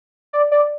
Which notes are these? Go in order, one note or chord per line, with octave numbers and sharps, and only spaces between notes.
D5
D5